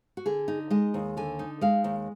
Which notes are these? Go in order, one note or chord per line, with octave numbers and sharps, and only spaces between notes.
F#4
D3 G#4
D#4
G#3 D#5
D#2
D3 G#5
D#4
G#3 F5
D#2